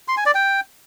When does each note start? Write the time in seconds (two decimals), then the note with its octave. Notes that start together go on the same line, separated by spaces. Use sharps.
0.08 C6
0.17 G#5
0.26 D5
0.35 G5